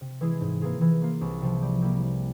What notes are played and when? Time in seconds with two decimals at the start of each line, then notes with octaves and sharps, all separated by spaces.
0.01 C3
0.21 E3 G#3 E4 G#4
0.41 G#2
0.61 E3 A#3 F4 G#4
0.81 E3
1.02 A#3 F4
1.21 C2
1.42 C3 F3
1.62 G3
1.82 A#3 E4 G4
2.02 G3